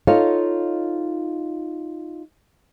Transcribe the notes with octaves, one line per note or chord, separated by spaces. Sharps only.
D#4 F4 A4 C#5 D#5 F5